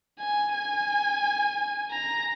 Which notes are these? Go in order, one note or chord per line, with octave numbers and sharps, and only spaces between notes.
G#5
G#5
A#5